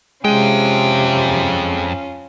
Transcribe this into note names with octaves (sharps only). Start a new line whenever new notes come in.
F2 C3 G#3 C#4 F4 G5 D#7